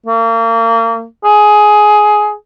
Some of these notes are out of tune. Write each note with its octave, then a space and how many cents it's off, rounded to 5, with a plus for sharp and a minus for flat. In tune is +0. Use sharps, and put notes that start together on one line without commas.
A#3 -35
G#4 +15